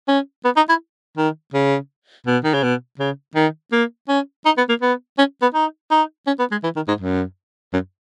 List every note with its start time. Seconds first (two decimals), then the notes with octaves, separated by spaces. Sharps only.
0.08 C#4
0.45 B3
0.57 D#4
0.69 E4
1.18 D#3
1.54 C#3
2.27 B2
2.44 D#3
2.54 C#3
2.63 B2
2.99 C#3
3.36 D#3
3.72 A#3
4.09 C#4
4.46 D#4
4.58 B3
4.69 A#3
4.82 B3
5.18 C#4
5.42 B3
5.55 D#4
5.91 D#4
6.27 C#4
6.39 B3
6.52 G#3
6.64 E3
6.76 D#3
6.88 G#2
7.00 F#2
7.74 F#2